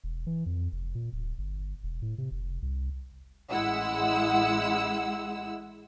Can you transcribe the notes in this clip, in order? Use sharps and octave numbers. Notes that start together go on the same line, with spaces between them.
E1
E3
F2
F1
A#2
D1
G1
E1
A2
C3
F1
C2
A1 G#3 E4 F#5 E6